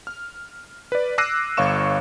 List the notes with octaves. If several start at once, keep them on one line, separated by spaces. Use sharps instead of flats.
F6
B4 D5
D6 E6 F#6 A#6 C7 D#7
G1 C#5 F5 C#6 E7